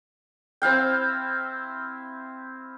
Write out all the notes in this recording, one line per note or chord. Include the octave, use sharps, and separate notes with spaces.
C4 E4 F5 G5